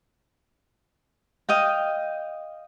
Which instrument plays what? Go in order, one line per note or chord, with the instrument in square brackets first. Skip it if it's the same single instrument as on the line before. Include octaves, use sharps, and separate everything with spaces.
[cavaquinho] D#5 F5 G5